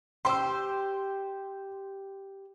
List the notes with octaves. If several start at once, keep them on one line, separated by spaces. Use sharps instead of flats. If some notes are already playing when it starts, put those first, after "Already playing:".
G4 C5 C6 E6